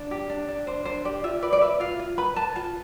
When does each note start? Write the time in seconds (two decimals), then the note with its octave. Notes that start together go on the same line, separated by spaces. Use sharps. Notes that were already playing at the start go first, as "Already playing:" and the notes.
Already playing: D4
0.11 G4
0.30 D4
0.48 D4
0.67 D4 C5
0.85 D4 C5
1.05 G4 D5
1.24 F4 E5
1.42 B4 D5
1.53 D5
1.61 B4 E5
1.80 F4 F5
1.99 F4
2.18 B4 B5
2.36 B4 A5
2.56 F4 A5